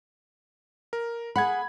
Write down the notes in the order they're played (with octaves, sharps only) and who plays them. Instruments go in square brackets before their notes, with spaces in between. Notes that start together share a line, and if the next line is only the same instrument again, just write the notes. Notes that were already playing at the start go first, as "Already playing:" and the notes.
[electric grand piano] A#4
[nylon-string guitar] G#4 F#5 [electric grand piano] B5 G#6